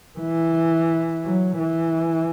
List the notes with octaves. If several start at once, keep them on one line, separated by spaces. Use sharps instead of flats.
E3
F#3
E3